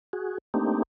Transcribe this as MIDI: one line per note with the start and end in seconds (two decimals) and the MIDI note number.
0.13 0.38 66
0.13 0.38 68
0.54 0.83 57
0.54 0.83 58
0.54 0.83 60
0.54 0.83 62
0.54 0.83 63
0.54 0.83 67